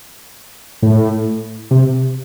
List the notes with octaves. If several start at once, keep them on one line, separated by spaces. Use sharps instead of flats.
A2
C3